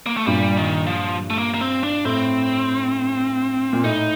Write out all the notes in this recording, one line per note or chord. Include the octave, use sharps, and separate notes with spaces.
A#3
A3
G2 A#2 G3
D#3
F3
A3
A#3
A#3
C4
D4
A2 C4
A#2
A2 D#4